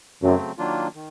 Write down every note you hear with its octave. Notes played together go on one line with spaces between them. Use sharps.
F#2 C#3 F#3 A3 C4
D#3 F#3 A#3 D4 F4
D#3